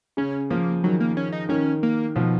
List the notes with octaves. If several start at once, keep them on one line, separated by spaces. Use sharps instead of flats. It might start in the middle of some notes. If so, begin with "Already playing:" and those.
C#3 C#4
F3 A#3
D#3 F#3
A#3
C#4
D#4
D#3 C#4
A#3
B2 F3